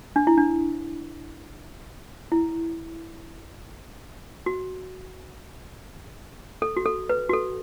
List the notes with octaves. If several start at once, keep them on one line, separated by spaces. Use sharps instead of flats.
D4
E4
D4
E4
F#4
A4
F#4
A4
B4
F#4
A4